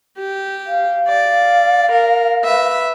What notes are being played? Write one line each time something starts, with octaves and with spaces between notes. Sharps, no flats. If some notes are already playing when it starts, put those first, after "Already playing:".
G4
F5
D5
A#4
B4 E5